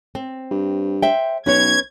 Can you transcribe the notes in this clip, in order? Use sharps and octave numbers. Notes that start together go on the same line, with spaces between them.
C4
G2
C5 E5 G5
B1 C#4 B4 C#5 G#6